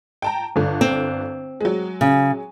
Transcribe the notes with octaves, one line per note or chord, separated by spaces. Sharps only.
G5 A5 A#5
G1 D3
C4
F#3 G#3
C#3